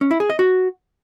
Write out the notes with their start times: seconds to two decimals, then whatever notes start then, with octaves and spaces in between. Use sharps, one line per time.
0.01 C#4
0.11 E4
0.20 G#4
0.30 D#5
0.39 F#4